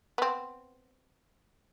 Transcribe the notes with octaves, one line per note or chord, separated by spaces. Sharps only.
B3 C4